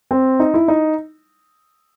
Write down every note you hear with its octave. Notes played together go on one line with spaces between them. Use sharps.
C4
D#4
E4
D#4